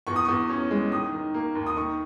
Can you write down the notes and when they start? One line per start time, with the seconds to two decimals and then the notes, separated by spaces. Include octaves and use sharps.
0.07 E2 C#6
0.16 D#6
0.25 E2 C#6
0.49 C#4
0.71 G#3
0.92 D#3 D#6
1.12 D#3
1.34 A#3
1.55 D#2
1.66 D#6
1.76 D#3 C#6